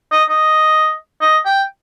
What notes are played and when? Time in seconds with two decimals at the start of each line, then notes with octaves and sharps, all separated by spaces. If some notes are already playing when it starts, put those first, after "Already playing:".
0.12 D#5
0.30 D#5
1.21 D#5
1.46 G5